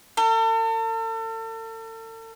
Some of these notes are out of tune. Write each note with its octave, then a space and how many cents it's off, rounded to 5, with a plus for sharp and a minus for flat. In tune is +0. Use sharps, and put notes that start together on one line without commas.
A4 +40